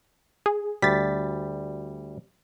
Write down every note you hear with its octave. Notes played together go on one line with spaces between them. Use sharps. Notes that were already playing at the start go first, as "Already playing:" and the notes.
G#4
D2 G3 A6 B6